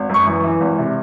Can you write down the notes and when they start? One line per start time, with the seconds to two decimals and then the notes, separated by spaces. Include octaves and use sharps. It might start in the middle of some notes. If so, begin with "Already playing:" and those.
Already playing: G#1
0.09 F#2 C#6
0.26 E3
0.43 E3
0.60 G#1
0.78 C3